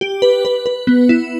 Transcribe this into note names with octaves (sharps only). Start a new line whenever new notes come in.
G4
B4
B4
B4
B3
E4